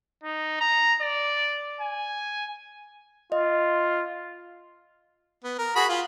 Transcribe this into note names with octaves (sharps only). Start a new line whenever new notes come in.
D#4
A#5
D5
G#5
F4 D#5
B3
A#4
F#4 G#4 B5
F4